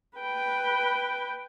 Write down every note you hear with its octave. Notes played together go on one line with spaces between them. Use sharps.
B4 G5